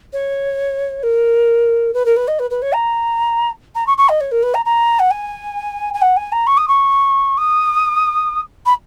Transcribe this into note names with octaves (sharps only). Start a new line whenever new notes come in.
C#5
A#4
B4
A#4
B4
D#5
B4
B4
C#5
A#5
A#5
C#6
C#6
D#5
C#5
A#4
B4
A#5
A#5
F#5
G#5
G#5
F#5
G#5
A#5
C#6
D#6
C#6
D#6
B5